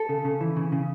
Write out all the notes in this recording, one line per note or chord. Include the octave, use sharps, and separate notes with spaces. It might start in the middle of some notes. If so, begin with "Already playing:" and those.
Already playing: A4
C#3
C#3
E3
C#3
C#3